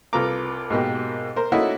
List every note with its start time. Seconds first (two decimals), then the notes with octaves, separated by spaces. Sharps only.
0.13 C2 F4 A4 B4 A#5 D6
0.70 G#2 B2 A#3 G4
1.36 A#4 C5
1.52 A3 A#3 C#4 D#4 E4 F#4